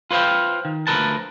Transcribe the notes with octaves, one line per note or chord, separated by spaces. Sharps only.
F4 B4 C5 F5 G5
D#3
D2 F3 F#3 A#4 B4 A5